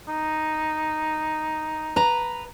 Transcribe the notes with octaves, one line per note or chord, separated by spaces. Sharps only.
D#4
B4 A#5